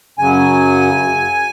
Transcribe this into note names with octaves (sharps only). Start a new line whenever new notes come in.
F#2 C#3 F#3 G#5